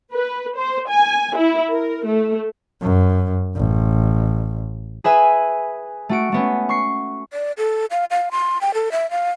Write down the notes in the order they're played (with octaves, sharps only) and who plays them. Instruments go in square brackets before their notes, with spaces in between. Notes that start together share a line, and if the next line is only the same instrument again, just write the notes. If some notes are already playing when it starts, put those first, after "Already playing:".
[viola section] B4
C5
G#5
E4
A#4
A3
[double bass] F#2
A1
[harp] G#4 B4 E5 G#5
A3 F#4 D7
A3 B3 C#4
C#6 C7
[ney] D5
A4
F5
F5
C6
G5
A4
E5
F5